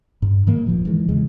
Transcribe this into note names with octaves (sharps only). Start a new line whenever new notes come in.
G2
G#2 D#3 A#3
D#1 F#2 F3
D#3 E3 G#3
E2 C#3 E3 G#3